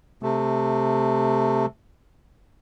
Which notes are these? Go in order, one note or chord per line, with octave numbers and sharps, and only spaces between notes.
C3 A3